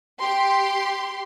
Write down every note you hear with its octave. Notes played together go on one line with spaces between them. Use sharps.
G4 C6